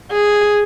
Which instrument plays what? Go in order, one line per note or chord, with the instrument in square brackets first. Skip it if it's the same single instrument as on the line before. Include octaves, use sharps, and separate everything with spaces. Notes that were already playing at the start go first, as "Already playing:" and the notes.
[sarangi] G#4